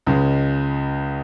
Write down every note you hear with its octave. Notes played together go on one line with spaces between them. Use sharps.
C#2 C#3 G#3